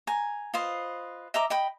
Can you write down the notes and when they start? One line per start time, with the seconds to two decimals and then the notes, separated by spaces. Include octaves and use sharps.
0.07 G#5 A#5
0.54 F4 B4 C5 D#5
1.34 D#5 E5 A#5 D6
1.50 D#5 G5 B5